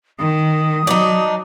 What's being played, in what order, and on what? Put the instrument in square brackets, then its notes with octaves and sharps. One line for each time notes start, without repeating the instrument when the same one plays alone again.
[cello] D#3 [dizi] D#6
[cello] F#3 [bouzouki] D4 D#4